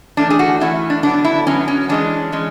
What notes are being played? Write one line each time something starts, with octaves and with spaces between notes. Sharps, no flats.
E3 A3 C#4 D4
G#4
F#4
E3 A3 C#4 E4
D4
D3 F#3 B3 D4
E4
D3 F#3 B3 C#4
C#4
E3 G#3 C#4 D4
E3 G#3 C#4